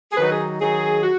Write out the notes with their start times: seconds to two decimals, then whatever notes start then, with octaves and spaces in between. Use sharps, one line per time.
0.12 G#4
0.17 D#3 F#3 D#4 B4
0.31 G#4
0.61 D#3 F#3 D#4 G#4
1.03 F#4